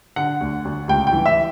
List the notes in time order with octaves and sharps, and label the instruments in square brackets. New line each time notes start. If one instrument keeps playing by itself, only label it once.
[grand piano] D3 F#5
D2
D2
C#2 G5
G5
E3
E5